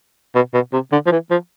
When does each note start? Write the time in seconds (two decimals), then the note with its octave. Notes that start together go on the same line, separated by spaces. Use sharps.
0.35 B2
0.53 B2
0.73 C3
0.92 D3
1.06 F3
1.11 E3
1.31 F3